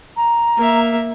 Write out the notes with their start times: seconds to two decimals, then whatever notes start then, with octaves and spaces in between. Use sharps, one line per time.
0.17 A#5
0.57 A#3 E5